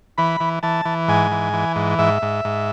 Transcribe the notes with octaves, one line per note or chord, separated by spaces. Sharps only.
E3 B5
E3
E3 A5
E3
G#2 G#5
E3
E3
G#2
G#2 E5
G#2
G#2